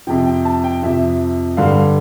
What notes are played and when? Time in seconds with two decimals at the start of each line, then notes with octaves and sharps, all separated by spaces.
0.07 F2 C3 F3 G5
0.26 G5
0.45 A5
0.64 G5
0.82 F2 C3 F3 E5
1.57 G2 D3 G3 F5